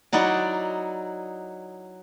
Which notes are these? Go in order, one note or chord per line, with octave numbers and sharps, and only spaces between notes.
F#3 D#4 E4 F#4 D5